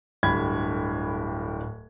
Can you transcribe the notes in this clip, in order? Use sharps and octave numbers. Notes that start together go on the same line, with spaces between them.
D1 G2 D3 B5 G#6